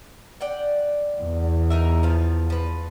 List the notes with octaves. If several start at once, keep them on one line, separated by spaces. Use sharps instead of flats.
D5 F#5 G5
E2
D#4 A#4 E5
F3 B3 F5
F3 B4